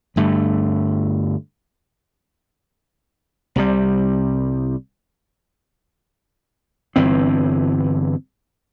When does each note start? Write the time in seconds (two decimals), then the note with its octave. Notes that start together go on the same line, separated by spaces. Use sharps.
0.16 G1 G2 D3 A3
3.56 C2 C3 G3
6.96 G1 G2 E3 C4